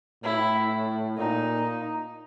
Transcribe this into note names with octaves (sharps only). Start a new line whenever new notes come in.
A2 E4
A#2 D#4